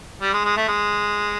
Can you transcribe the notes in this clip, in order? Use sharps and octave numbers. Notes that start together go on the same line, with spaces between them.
G3
G#3
G#3
A3
G#3